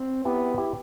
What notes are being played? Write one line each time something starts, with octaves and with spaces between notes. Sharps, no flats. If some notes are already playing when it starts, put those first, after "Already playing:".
Already playing: C4
B3 E4 G4
E4 G4